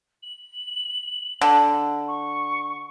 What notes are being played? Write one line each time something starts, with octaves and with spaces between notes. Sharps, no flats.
F#7
D3
C#6